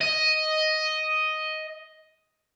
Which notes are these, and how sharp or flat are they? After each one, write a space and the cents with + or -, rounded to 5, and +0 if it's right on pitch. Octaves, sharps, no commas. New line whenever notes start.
D#5 +5